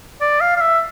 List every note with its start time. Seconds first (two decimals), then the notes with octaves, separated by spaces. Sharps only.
0.21 D5
0.41 F5
0.57 F5
0.61 E5